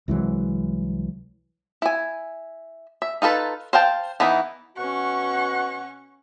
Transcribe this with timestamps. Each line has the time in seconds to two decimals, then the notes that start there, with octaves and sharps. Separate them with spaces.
0.08 C2 E3 F#3 G#3
1.82 E4 G#5
3.02 E5
3.22 D#4 F4 A4 B4
3.73 C5 F5 G5 A5
4.20 E3 B3 D#4 E4
4.77 B2 C#4 F#4 F#5 C#6